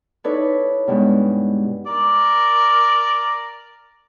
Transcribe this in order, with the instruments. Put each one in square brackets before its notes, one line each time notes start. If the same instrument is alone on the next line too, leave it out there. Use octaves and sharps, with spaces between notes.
[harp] D#4 E4 A4 B4 C#5 D5
G2 B2 G#3
[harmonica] A#4 D5